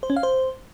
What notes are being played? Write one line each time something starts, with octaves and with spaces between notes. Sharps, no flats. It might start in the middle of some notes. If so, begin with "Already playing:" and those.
C5
C#4
F5
C5